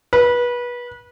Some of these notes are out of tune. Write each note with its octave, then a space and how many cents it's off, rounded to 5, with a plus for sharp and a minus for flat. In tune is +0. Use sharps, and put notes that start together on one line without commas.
B4 -25